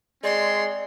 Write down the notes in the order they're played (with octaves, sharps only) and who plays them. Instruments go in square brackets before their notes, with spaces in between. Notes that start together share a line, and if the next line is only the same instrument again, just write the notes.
[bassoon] G#3 [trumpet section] C4 C#5 C6 [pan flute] D5